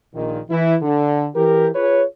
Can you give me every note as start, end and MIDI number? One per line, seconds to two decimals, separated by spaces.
0.14 0.39 34
0.14 0.39 46
0.14 0.39 51
0.49 0.75 52
0.49 0.75 64
0.81 1.25 50
1.35 1.68 52
1.35 1.68 67
1.35 1.68 70
1.74 2.03 65
1.74 2.03 68
1.74 2.03 71
1.74 2.03 73